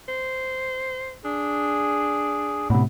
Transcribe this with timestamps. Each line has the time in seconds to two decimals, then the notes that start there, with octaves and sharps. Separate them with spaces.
0.08 C5
1.25 D4 G#4
2.70 A2 C3 B3